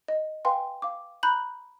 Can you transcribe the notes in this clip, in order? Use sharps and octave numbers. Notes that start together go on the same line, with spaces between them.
D#5
B4 F5 G5 G#5 C6
F5 D6
A#5 B5 F#6 G6 F#7